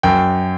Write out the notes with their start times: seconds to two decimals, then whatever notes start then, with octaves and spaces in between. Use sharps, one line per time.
0.03 F#2 G5